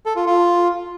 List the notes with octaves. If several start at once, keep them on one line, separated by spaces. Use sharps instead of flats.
A4
F4
F4